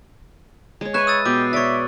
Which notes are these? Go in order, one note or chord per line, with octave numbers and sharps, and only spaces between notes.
G#3 C#5
B4 C#5 E5 F#6 D#7
D#6 E6 A6
B2 G4 D6
C#5 D5 E5 C#6 A6